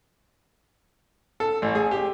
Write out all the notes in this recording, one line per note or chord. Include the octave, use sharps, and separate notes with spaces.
A4
A1
G#4
G4